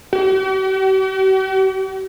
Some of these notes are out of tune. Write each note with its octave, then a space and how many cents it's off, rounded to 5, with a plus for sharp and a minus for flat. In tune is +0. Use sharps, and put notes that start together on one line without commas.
G4 -45